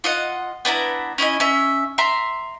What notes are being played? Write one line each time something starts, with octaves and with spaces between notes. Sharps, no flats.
F4 D#5 F#5
B3 D4 E4 A#5
C#4 E4 D#5 G#5
C#4 E5
E5 A#5 C6